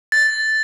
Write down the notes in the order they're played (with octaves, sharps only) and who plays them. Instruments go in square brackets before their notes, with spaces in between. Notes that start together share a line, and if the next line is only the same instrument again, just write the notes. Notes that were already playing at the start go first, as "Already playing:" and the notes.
[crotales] A6